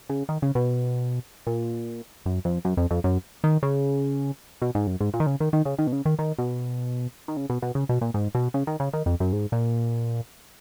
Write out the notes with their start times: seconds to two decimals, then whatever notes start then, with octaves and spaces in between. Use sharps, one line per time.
0.09 C#3
0.29 D#3
0.42 C#3
0.55 B2
1.47 A#2
2.26 F#2
2.45 F2
2.65 F#2
2.77 F2
2.91 F2
3.04 F#2
3.44 D#3
3.63 C#3
4.62 B2
4.75 G#2
4.87 F#2
5.01 G#2
5.14 A#2
5.20 D#3
5.27 C#3
5.40 D#3
5.53 D#3
5.65 C#3
5.79 D#3
5.87 B2
5.93 C#3
6.05 D#3
6.19 D#3
6.38 B2
7.28 D#3
7.37 C#3
7.50 B2
7.62 B2
7.75 C#3
7.89 B2
8.01 A#2
8.14 G#2
8.35 B2
8.54 C#3
8.67 D#3
8.80 C#3
8.93 D#3
9.06 F2
9.20 F#2
9.33 G#2
9.52 A#2